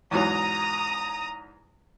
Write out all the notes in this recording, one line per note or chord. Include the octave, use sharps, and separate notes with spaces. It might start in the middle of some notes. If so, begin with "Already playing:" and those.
E2 G#2 F#3 A#5 D#6